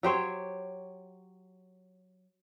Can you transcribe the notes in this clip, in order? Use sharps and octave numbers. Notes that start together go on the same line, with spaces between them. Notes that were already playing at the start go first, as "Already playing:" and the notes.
F#3 G4 C5 C#5